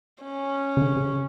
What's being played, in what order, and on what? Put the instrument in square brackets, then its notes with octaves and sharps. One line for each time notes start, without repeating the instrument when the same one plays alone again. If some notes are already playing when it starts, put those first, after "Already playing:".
[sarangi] C#4
[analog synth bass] C#3
D3
C#3